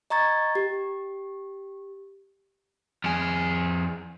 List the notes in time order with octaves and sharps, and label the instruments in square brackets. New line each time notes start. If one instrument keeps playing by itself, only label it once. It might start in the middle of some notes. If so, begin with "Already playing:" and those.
[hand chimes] D#5 A#5 C#6 G#6 A6
G4
[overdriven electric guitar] F2 G#4